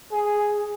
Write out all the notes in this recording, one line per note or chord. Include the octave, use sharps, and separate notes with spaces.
G#4